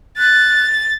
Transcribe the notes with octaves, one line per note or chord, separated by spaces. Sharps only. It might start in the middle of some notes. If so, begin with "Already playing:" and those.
F#6 A6